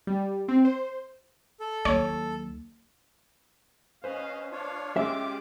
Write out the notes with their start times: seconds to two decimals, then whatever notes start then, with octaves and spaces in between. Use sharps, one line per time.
0.07 G3
0.48 C4
0.65 C5
1.60 A4
1.85 D#2 F#3 C#5
4.04 C#4 B4 C5 D#5 F5
4.52 D4 F4 C#5 F5
4.96 G#3 C#4 F4 G4 G#4 E5 D6